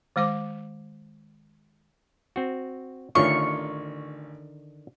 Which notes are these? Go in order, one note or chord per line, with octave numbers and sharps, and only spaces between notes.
D#3 G#3 C5 D6
C4 F#4
A1 D3 D#3 D4 F4 C#5 C#6